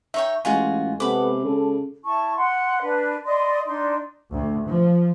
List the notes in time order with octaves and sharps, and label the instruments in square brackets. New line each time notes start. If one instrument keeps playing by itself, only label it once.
[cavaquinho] D#4 C#5 G5 [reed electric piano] E5
[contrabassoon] A1 [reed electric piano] G#3 D#5 G#5 [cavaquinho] F4 F#4 G#4
[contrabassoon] C3 [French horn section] B3 A4 [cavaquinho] B5 D6
[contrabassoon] C#3 [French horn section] A4
[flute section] E4 A5 C#6
F#5 C6
D4 B4
D5 D#5 B5 C6
D4 D#4 D5 C6
[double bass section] D2
F3